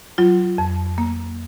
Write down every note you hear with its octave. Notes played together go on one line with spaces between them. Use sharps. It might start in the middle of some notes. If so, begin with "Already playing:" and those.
F#3 F4
F2
A#3